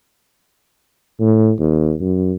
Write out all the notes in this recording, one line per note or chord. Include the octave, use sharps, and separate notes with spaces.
A2
D#2
F#2